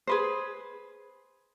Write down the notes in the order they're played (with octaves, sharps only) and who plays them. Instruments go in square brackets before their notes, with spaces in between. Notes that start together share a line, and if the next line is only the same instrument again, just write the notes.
[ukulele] G#4 B4 C5